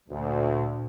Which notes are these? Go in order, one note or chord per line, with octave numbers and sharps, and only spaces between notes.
D2 A#2